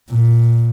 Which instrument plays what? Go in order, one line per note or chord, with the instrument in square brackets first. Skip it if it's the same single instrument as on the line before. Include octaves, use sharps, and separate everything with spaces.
[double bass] A#2